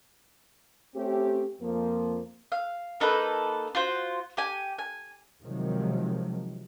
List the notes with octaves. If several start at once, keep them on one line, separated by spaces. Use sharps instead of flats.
A3 C4 C#4 G4
F2 F3 A#3
F5
A#3 D#4 A4 B4
F4 F#4 C5
G4 G#5
G#5
C3 D#3 F3 F#3 G#3